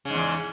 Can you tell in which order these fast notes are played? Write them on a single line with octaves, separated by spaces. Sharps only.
C#3 G#2 E2